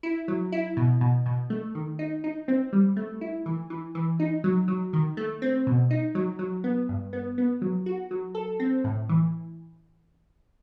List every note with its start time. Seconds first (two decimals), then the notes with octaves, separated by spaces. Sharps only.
0.03 E4
0.28 F#3
0.52 E4
0.77 B2
1.01 B2
1.26 B2
1.50 A3
1.75 D#3
1.99 D#4
2.24 D#4
2.48 C4
2.73 G3
2.96 A3
3.21 E4
3.46 E3
3.70 E3
3.95 E3
4.20 D#4
4.44 F#3
4.68 F#3
4.93 D#3
5.17 A3
5.42 C4
5.67 B2
5.91 D#4
6.15 F#3
6.39 F#3
6.64 B3
6.89 G2
7.13 B3
7.38 B3
7.62 F#3
7.86 F#4
8.11 F#3
8.35 A4
8.60 C4
8.84 A2
9.09 E3